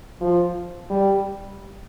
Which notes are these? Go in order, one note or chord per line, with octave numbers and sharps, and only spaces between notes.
F3
G3